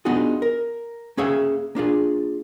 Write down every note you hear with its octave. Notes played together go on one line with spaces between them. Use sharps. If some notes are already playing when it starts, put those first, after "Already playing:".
B3 D4 D#4 F4 F#4 G#4
A#4
A#3 C#4 G#4 C#5 E5 F5
A#3 D4 F4 G#4